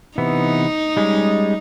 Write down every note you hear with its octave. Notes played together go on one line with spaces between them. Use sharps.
C3 E3 B3 D#4
G3 G#3 C#4